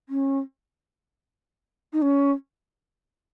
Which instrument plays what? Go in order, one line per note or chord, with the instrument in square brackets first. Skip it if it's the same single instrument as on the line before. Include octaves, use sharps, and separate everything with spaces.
[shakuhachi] C#4
D#4
C#4